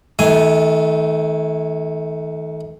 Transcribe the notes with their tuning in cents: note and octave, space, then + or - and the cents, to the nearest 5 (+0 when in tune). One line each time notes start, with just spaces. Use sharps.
D#3 +35 A3 -15 G#5 +0